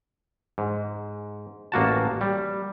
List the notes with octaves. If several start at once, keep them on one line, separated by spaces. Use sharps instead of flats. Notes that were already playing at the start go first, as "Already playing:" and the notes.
G#2
A1 A#3 F#4 A5
G3